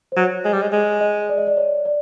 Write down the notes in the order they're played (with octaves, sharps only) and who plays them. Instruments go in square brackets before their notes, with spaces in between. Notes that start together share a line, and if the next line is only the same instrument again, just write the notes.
[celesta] C5
[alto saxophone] F#3 [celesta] C#5
[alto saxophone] G#3
G3
G#3
G#3
[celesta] D#5
D5
D#5
D5
C#5
D5